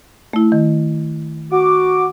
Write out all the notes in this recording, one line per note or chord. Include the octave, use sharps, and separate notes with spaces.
A3 E4
D#3
F#4 D6